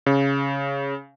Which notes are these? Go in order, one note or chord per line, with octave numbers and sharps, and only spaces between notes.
C#3